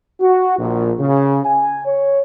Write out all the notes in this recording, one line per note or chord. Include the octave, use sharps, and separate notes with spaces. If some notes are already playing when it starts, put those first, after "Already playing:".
F#4
A#1
C#3
G#5
C#5